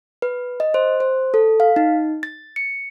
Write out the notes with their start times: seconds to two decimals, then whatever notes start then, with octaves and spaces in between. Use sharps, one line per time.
0.22 B4
0.60 D#5
0.74 C5
1.00 C5
1.34 A4
1.60 F5
1.76 D#4
2.23 A6
2.56 C#7